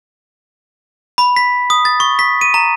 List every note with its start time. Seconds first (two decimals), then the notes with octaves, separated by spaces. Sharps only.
1.18 B5
1.36 B6
1.70 D#6
1.85 A6
2.00 C#6
2.19 B6
2.41 D#7
2.54 A#5